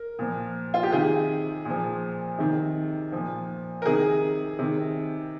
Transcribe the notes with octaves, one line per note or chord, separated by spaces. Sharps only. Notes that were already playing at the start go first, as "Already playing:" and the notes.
Already playing: A#4
A#2 F3
F4
G4
C3 D#3 G#4
A#2 F3
C3 D#3
A#2 F3
A#4
C3 D#3 G#4
C3 D#3